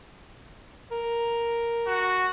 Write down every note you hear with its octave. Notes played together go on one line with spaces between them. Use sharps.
A#4
F#4